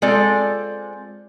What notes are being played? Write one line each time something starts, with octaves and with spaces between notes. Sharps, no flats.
G#3 C4 F4 A4 D5